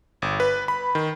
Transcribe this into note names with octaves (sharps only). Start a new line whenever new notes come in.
G1
B4
B5
D#3